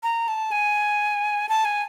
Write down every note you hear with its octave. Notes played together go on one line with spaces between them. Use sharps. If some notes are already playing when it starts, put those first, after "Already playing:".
A#5
A5
G#5
A5
G#5